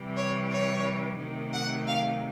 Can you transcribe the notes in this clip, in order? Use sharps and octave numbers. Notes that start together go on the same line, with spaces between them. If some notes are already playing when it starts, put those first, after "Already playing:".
Already playing: C3 E3 G3
C#5
C#5
C3 D#3 F#3 A3
F#5
F5